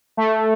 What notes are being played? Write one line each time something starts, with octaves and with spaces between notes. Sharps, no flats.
A3